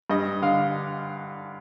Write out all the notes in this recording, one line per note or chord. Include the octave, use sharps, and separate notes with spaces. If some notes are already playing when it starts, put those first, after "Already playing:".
G2 D#5
D3 F5